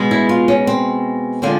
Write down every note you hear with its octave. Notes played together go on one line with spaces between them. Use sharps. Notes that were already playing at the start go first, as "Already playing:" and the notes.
Already playing: B2 G#3 B3
E4
F4
C#4
C4
D3 F3 G#3 C4